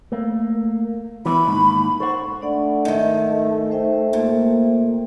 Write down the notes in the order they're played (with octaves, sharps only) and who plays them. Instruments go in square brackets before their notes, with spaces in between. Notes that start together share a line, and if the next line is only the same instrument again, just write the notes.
[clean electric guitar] A3 A#3
[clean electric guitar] E3 B3 E4 [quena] B5
[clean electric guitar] D#2 G#2 D#3
[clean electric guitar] A4 C5 F#5 [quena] C#6
[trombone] A3 [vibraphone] D4 D5 F#5
[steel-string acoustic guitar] G#2 D#3 [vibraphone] E5
[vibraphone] C5 E5 G5
[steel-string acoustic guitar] A#2 [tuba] A#3